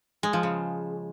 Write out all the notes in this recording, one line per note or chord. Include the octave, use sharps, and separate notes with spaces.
G#3
F3
C#3